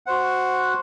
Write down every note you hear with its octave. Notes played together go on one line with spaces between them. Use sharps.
F#4 C5 F#5